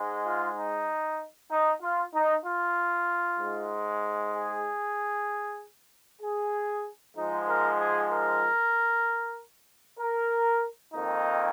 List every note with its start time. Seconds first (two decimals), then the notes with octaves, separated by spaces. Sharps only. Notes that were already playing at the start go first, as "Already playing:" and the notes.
Already playing: G#2 G#3
0.25 F4
0.57 D#4
1.51 D#4
1.82 F4
2.14 D#4
2.46 F4
3.39 G#2 G#3
4.33 G#4
6.22 G#4
7.17 G#2 F3 G#3 D#4
7.48 A#4
7.80 G#4
8.11 A#4
9.99 A#4
10.94 F2 D#3 A#3 D#4